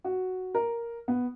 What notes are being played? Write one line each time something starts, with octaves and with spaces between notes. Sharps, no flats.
F#4
A#4
B3